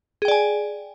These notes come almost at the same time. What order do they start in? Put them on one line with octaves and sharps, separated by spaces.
G#4 G5 D5 G#5